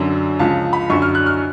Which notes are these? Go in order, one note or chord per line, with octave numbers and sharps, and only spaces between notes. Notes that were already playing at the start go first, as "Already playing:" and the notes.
Already playing: F#2 D3 F#3
C#2 C#3 F3 A5
B5
F#2 D3 F#3 C#6
F6
F#6
F6